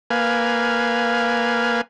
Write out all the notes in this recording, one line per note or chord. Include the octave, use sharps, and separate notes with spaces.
A#3 B4 F5 G#5